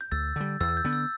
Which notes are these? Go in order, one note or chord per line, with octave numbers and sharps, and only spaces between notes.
G6
D2 E6 A6
D3 G3
E2 E6 A6
G6
D3 B3
E6